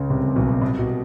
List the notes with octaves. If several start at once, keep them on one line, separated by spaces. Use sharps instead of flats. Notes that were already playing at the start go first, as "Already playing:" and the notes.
Already playing: C#2 C#3
C2 C3
C3
B1 B2
C2 C3
B2